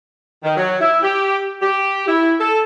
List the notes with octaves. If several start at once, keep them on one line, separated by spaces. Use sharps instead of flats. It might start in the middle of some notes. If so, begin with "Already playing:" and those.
D#3
F#3
E4
G4
G4
E4
A4